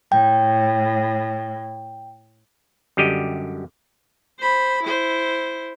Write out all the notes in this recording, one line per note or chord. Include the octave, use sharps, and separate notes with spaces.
A2 G5
F#2 D3 G3 G4 D#5
C5 B5
E4 C5